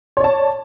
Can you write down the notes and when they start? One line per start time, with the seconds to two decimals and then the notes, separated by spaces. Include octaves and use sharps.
0.17 C#5
0.20 D5
0.24 A5